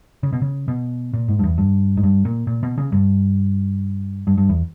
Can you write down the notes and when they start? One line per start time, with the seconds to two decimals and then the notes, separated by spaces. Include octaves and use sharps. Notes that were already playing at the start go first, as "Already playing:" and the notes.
0.23 C#3
0.33 B2
0.42 C#3
0.68 B2
1.14 A#2
1.28 G#2
1.39 G2
1.43 E2
1.58 G2
1.97 G#2
2.03 G2
2.25 A#2
2.47 A#2
2.63 B2
2.78 C#3
2.92 G2
4.27 G2
4.38 G2
4.49 E2